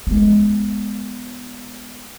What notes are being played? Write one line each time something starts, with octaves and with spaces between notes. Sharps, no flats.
G#3 B3